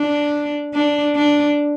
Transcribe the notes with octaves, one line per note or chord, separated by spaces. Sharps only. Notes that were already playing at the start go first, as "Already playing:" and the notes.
Already playing: D4
D4
D4